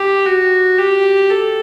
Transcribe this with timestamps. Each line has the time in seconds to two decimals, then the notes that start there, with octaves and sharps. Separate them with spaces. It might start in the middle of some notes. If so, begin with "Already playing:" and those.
Already playing: G4
0.26 F#4
0.78 G4
1.30 A4